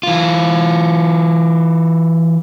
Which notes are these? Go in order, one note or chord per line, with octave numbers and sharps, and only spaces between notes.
E3 F4